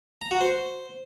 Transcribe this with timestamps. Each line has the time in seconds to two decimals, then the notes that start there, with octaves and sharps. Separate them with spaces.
0.21 A#5
0.31 F#4
0.41 C5